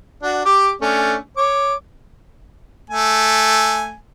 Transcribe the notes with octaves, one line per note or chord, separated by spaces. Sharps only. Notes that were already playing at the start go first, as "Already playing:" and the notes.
D4 F#4
G4 D6
A3 C#4 D4
C#5 D6
A3 G#5